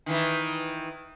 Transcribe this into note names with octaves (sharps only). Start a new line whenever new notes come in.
D#3 E3 E4